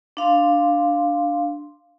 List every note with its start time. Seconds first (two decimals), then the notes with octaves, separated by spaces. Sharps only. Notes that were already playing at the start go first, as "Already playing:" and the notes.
0.17 D4 F5 C6